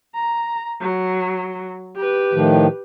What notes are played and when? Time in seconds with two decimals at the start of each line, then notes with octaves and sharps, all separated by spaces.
0.15 A#5
0.81 F#3
1.96 G4 B4
2.33 A2 D#3 F3